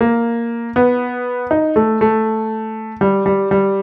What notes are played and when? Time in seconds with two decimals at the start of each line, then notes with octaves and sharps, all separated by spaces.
0.01 A#3
0.76 B3
1.51 D#4
1.76 A3
2.01 A3
3.01 G3
3.26 G3
3.51 G3